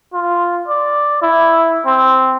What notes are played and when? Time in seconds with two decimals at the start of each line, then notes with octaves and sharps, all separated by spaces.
0.14 F4
0.68 D5
1.22 E4
1.86 C4